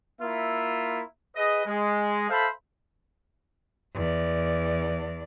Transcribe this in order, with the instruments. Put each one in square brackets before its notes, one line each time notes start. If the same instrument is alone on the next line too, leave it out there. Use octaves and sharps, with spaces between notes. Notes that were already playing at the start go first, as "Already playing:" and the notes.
[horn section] A#3 E4 F4 E5
G#4 B4 D#5
G#3
A4 C5 E5 F5 B5
[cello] E2 D5